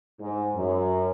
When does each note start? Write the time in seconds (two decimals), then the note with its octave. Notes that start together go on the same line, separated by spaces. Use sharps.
0.21 G#2
0.55 F#2